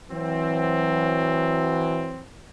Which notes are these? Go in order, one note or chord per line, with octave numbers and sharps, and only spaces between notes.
E3 F#3 C4